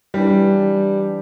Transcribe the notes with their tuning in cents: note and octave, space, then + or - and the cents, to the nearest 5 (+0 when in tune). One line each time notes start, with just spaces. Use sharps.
E3 +0 G3 +0 D4 +0